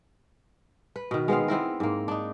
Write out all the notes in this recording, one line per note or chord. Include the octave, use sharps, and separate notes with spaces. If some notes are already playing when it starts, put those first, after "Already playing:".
B4
B2 D#3
G#3 B3 C4 F5
B3 C4 E4 A#4
G#2 A#3
D4 D#4